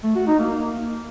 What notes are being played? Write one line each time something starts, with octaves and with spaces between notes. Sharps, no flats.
A3
F#4
D#4
A#3